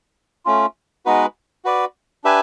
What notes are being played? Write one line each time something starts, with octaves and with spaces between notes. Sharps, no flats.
A3 C#4 F4
G#3 B3 D#4 F#4 B4
F#4 B4 D5
D4 G4 B4 E5 G#5